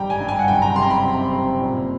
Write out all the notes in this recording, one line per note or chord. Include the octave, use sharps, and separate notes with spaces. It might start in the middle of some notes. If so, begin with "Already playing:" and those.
Already playing: G#1 G2 G3 G5 A#5
G#5
G2
G#5
F#5
F#1 G5
A#5
C3 C6
A#5
B5
C3
C3
A#2